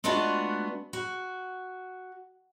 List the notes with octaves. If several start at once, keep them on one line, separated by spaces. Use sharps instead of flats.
G#3 A3 B3 D4 F4 F#4
F#4